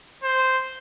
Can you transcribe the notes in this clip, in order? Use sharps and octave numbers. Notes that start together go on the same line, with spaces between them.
C5